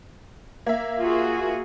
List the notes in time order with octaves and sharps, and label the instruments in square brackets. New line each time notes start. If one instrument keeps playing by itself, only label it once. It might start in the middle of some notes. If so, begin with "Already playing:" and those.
[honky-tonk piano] A#3 E5
[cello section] F4 F#4 G#4